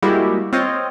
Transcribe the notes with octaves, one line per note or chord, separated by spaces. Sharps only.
G3 G#3 A#3 E4 F#4 G4
C4 F4 C5 C#5 D#5